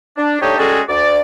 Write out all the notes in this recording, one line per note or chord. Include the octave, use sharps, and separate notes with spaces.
D4
G3 A3 D4 D#4 G4 C#5
G3 G#3 C#4 F#4 G#4 A4
D2 D5